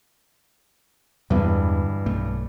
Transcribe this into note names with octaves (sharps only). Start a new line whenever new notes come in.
E2 G2 B2 D3 E3 G#3
B1 A3